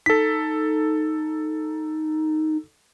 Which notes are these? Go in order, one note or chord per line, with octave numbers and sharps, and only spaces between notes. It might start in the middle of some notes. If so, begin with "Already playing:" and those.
D#4 A4 B6